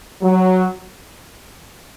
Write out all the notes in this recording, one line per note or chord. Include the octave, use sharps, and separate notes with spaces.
F#3